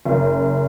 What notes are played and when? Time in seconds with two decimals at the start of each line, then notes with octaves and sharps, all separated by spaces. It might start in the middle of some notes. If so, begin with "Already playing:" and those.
0.05 F#1